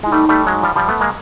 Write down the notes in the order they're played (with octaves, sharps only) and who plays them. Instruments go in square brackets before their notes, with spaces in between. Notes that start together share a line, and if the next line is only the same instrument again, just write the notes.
[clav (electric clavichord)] G#3 [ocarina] E4
[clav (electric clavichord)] G3 A3 [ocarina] D#4
[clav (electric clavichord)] G3 A3
F#3 G#3
F3 G3
F3 G3
A3 B3
G#3 A#3